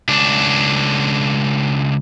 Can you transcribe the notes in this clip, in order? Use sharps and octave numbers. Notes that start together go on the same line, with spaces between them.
C#2 D4